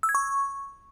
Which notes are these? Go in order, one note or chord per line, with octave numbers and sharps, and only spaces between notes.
E6
G#6
C#6